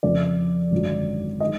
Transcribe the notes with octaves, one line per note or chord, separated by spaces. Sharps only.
F2 C#3 F3 D5
G#1 F#2 D3 F#3
D#3 G#3 D#5